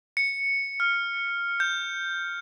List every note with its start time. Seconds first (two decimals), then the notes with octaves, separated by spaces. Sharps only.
0.17 C#7
0.80 F6
1.60 G6